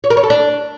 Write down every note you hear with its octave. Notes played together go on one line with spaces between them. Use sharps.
C#5
A#4
C#5
A4
D4